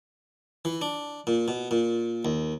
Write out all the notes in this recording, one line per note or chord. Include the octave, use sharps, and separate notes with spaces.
E3
D4
A#2
B2
A#2
D#2